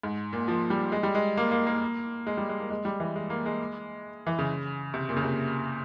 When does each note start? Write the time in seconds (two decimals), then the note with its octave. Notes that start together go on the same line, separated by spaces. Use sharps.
0.03 G#2
0.33 A#2
0.48 F3
0.70 G3
0.92 G#3
1.03 G3
1.15 G#3
1.37 A#3
1.52 A#3
1.67 A#3
2.27 G#3
2.37 G3
2.49 G#3
2.60 A#3
2.70 G#3
2.85 G3
3.00 E3
3.16 G#3
3.30 A#3
3.46 G#3
4.27 E3
4.39 C#3
4.94 C3
5.09 A#2
5.17 C#3
5.23 C3